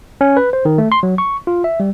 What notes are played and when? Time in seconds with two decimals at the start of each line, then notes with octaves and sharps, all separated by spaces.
0.21 C#4
0.37 B4
0.53 C5
0.65 D#3
0.78 A3
0.92 C6
1.03 F#3
1.18 C#6
1.47 F4
1.64 E5
1.80 G3